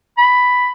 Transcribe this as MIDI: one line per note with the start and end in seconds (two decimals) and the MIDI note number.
0.18 0.72 83